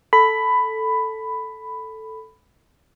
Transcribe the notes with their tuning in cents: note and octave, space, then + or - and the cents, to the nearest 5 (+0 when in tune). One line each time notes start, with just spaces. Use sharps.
A4 +0 B5 +10